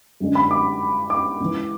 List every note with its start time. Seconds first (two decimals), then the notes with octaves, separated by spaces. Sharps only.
0.20 F#2 D3 G#3 D4
0.35 B5
0.51 D6
1.10 D6
1.40 C#2 C#3 E3